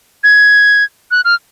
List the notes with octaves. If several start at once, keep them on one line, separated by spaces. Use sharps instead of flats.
G#6
F#6
F6